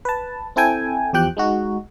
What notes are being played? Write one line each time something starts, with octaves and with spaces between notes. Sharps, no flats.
B4 A5
C4 E4 A4 G5 G#5
E2 F3 G4 G5 F#6
G#3 D#4 F#4